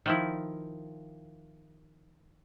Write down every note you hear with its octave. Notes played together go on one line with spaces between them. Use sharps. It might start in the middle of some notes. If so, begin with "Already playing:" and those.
D#3 F3 E4